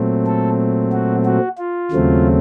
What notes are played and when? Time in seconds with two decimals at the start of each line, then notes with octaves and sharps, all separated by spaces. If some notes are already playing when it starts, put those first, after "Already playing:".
Already playing: A#2 F#3 A3 C4
0.26 A4
0.92 F#4
1.25 F#4
1.58 F4
1.91 D#2 C#3 F#3 A3 C4